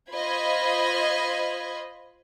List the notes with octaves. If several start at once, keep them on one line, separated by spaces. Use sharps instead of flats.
F4 C5 D#5 B5 G#6